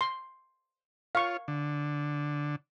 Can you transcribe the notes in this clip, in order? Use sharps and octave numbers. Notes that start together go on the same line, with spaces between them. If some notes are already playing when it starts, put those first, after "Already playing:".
C6
F4 C#5 F5 C#6
D3